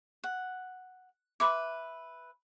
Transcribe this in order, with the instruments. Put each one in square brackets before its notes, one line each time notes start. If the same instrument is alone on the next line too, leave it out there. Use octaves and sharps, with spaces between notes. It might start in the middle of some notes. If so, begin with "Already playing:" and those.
[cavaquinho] F#5
[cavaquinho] B4 E5 [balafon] B5 C6 D6